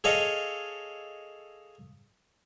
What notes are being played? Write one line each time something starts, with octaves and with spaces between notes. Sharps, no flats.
G#4 A4 C#5 D#5 F5